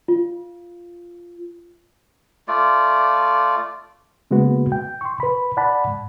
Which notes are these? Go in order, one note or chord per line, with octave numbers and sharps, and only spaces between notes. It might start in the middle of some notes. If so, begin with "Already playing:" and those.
F4
A3 F4 D5
C#3 G#3 A#3 B3 F#4 B4
G5
C6 C#6
B4 B5
D5 F#5 A5 B5
G#2